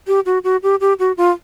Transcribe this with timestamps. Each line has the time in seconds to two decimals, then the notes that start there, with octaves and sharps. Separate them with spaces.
0.07 G4
0.26 F#4
0.44 F#4
0.63 G4
0.80 G4
0.99 F#4
1.17 F4